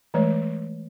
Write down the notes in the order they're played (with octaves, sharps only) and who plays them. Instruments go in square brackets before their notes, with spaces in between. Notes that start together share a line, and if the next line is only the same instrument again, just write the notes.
[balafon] E3 G#3 A3 C#5